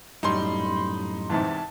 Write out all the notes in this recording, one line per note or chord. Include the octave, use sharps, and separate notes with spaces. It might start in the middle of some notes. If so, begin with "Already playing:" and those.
F#2 A2 G3 D#4 B5 C6
E2 G#2 C3 A5